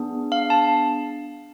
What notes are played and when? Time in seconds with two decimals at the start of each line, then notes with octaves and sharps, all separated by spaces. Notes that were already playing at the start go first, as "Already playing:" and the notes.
Already playing: B3 D4 G#4
0.32 F5
0.50 A5